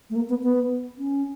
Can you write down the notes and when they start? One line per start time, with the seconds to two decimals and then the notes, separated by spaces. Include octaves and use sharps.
0.10 A3
0.16 A#3
0.29 B3
0.43 B3
0.98 C#4